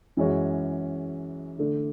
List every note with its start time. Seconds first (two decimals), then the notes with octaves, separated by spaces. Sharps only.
0.17 F#2 E3 G#3 C#4 F#4
1.58 D3 A3 D4